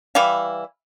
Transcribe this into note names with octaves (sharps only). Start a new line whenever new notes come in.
E3 G3 E4 F5